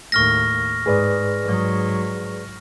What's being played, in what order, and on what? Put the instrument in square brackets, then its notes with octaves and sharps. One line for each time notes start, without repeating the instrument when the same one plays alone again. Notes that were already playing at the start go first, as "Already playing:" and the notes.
[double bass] D#2 A2 [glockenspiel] C#6 F6 A#6
[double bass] G#2 [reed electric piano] G#4 B4 D5
[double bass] G#2 F#3